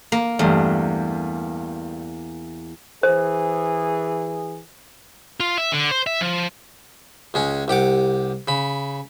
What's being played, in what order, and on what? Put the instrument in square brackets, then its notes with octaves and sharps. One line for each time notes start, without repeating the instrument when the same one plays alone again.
[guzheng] A#3
[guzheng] E2 [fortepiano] G2 A3
[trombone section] E3 G#4 [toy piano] C5
[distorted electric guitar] F4
E5
D3
C5
E5
F3
[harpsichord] C#2 G#3 C#4
C2 G4 F#5 D6
C#3 B5